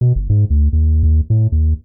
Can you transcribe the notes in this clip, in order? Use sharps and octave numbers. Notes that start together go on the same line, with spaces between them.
B2
G1
G#2
D2
D#2
D#2
A2
D#2